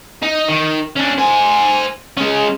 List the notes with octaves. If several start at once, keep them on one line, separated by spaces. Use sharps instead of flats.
D#4
D#3
C#4 D4
C5 G#5
G#3 C#4